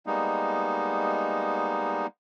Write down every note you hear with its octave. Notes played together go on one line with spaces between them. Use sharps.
G3 G#3 A#3 B3 D#4